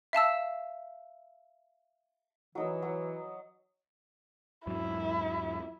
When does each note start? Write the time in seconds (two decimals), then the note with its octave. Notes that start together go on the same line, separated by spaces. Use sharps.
0.13 E5 F5 A5 E6
2.55 E3 F#3 D#4 E6
2.82 F#3
4.67 E2 G#2 F#3 E4